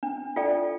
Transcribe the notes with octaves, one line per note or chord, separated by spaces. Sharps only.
D4
F4 A4 D5 G5